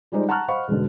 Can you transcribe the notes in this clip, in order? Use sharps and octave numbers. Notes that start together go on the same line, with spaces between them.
F3 G3 G#3 D#4 C5 D5
F#5 A5 A#5 C#6 F6 F#6
C5 D#5 F5 F#5 B5 C#6
E1 G#2 B2 D3